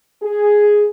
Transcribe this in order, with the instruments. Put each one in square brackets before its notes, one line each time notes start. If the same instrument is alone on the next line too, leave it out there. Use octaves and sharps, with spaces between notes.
[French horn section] G#4